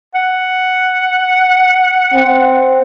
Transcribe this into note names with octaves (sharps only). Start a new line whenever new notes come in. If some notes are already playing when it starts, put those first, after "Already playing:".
F#5
C4